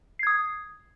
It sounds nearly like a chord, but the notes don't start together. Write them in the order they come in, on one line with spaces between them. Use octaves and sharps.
C7 G#6 D#6